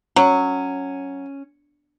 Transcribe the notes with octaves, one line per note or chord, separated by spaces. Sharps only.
F#3 C#4